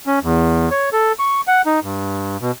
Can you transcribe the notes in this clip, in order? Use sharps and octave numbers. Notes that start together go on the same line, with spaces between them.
C#4
E2
C#5
A4
C#6
F#5
D#4
G2
B2